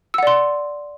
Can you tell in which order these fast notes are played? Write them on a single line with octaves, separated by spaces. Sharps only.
E6 F#5 D5 C6